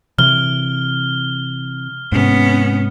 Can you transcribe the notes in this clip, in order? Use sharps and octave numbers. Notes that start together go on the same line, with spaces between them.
C3 E3 F6 G7
G#2 C3 B3 C#4